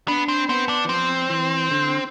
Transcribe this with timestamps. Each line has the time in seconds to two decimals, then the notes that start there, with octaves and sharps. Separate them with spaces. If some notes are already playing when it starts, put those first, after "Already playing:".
0.08 B3 D4
0.28 C4
0.49 B3 C4
0.69 D4
0.85 E3
0.89 F3 C4
1.30 E3
1.71 D3